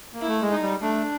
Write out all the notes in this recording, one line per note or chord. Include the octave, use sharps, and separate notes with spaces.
A#3
E4
A3
G#3
D#4
G3
A3 D4